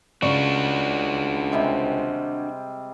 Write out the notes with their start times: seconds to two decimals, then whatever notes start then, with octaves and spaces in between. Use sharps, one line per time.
0.22 C#2 C#3 D4 F#4 D5 C#6
1.52 C3 G3 G#3